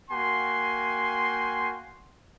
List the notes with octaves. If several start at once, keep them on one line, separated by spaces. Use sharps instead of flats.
A#3 F#4 G5 G#5 C6